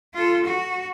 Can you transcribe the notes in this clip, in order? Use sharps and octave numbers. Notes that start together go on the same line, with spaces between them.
F4 A4
F#4